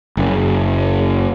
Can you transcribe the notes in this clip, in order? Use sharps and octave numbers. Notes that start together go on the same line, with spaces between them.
F#1